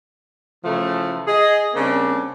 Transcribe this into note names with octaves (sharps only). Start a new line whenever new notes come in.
C#3 E3 F3 A3 E4 A4
G#4 D#5
C#3 G3 A#3 C4 D4